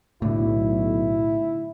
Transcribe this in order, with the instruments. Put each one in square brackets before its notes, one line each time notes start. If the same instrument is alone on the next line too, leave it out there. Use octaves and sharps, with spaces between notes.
[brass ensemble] B1 [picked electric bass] A2 D3 [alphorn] E4